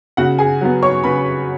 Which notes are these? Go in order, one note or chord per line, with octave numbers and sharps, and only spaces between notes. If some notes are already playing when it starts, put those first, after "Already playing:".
C#3 F#4 F#5
G#4 G#5
F#3 B3
C#5 C#6
C#3 B4 B5